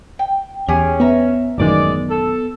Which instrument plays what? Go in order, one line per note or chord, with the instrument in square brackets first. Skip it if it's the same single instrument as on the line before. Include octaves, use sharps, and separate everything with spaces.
[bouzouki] G5
[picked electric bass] E2 [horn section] C#4 [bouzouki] G4 G#4
[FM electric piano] B3 [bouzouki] E5 A#5
[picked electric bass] A1 F#2 D#3 [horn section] G#3 D5
[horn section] A4